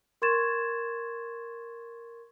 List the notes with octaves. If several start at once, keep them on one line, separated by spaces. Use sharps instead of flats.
A#4 C6 C#6 G#6 A6 E7